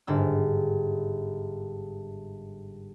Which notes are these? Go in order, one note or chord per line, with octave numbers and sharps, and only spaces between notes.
G1 G#2 E6